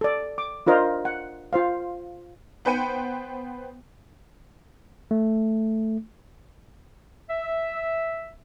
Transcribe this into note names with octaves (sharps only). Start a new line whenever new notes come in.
A4 D5
D6
D4 F4 A#4 C5 D#5
F#5
F4 C5 F5
B3 B4 C5 G5 C#7 D#7
A3
E5